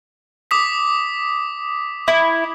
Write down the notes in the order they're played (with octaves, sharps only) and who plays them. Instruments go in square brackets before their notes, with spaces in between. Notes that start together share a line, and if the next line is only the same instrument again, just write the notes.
[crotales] D6 D#6 B6
[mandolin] E4